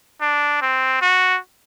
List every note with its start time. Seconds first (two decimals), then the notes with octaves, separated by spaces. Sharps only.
0.21 D4
0.62 C4
1.02 F#4